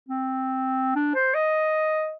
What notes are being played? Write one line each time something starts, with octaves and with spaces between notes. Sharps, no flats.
C4
D4
C5
D#5